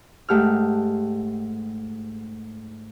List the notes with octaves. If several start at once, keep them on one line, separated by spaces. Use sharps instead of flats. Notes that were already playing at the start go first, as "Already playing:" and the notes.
G#2 A3 G4 F#5 F6